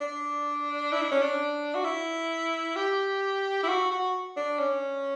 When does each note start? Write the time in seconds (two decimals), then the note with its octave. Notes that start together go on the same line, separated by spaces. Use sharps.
0.01 D4
0.93 E4
1.02 D4
1.12 C#4
1.22 D4
1.75 F#4
1.84 E4
2.76 G4
3.63 E4
3.68 F#4
3.91 F#4
4.37 D4
4.59 C#4